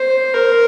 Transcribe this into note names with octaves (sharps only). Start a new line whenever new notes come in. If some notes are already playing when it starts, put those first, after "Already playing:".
Already playing: C5
A#4